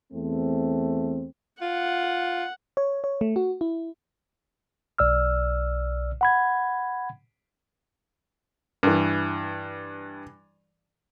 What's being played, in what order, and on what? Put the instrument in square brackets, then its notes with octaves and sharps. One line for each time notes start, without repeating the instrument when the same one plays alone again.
[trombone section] E2 A3 C4
[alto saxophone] F4 [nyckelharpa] F#5
[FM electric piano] C#5
C#5
A3
F#4
E4
[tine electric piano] B1 D5 E6 F6
F#5 B5 G#6
[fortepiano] G2 E3